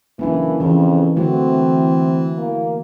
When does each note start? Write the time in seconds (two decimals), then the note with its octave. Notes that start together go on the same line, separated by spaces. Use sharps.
0.19 F#1 E3 A#3 D4
0.60 F2 C#3 E3
1.16 D3 E3 A3 C4 F#4
2.37 A#3